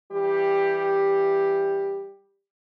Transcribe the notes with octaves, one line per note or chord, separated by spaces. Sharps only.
E3 G3 G4